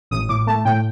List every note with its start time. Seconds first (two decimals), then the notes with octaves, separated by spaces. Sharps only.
0.11 A1 D#6
0.29 A2 D6
0.47 A3 A5
0.65 A2 G5